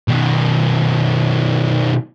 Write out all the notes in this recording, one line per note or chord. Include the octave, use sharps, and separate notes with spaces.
B2 D#3